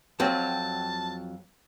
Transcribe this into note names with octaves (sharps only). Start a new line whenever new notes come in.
F2 F#3 C4 A5